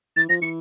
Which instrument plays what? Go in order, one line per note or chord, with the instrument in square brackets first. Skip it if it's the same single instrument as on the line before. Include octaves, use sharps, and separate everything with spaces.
[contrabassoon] E3 [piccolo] A6
[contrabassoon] F3 [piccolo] A#6
[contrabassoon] E3 [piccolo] C#7